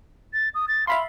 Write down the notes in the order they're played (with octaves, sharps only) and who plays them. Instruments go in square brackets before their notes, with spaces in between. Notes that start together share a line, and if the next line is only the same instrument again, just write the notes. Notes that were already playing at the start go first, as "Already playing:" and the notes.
[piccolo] A6
D#6
A6
[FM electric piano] E5 B5 C6 [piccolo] F5